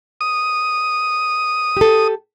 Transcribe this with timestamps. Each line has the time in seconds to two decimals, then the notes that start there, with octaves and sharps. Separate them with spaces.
0.21 D#6
1.77 G4 A4